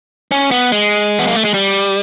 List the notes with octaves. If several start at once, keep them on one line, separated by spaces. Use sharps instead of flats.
C#4
B3
G#3
B3
A#3
A3
G#3
G3